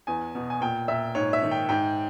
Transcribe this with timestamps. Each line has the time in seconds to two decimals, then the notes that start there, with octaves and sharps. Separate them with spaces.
0.07 E2 G#5
0.35 B2
0.50 G#5
0.61 A#2 G5
0.88 A#2 E5
1.15 G#2 C#5
1.33 E5
1.43 D#3
1.51 G5
1.69 G#2 G5